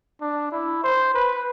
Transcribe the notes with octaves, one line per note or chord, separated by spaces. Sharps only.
D4
E4
C5
B4